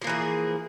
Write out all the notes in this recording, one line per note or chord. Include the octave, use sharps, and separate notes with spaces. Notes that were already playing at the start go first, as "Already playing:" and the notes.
E3 F3 A#3 G#4